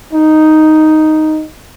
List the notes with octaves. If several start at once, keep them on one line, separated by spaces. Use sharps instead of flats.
D#4